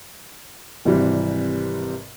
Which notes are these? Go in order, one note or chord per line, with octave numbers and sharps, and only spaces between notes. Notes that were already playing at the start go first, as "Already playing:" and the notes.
G#1 C3 E3 G3